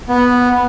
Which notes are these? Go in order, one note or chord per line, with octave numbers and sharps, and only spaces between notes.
B3